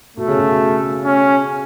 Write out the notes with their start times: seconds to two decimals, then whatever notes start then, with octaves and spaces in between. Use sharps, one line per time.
0.17 B2 A3
0.28 C#3
0.39 B2
1.05 C#4